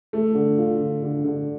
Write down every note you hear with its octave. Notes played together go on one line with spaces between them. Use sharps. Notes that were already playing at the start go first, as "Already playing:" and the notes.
A3
D3
F4
D3
D3
D3